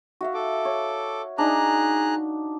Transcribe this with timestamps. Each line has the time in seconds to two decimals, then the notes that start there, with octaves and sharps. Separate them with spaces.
0.21 F#4 E5 F5
0.34 A4 D6
0.65 C#5
1.38 D4 D#4 G#4 A#5 F#6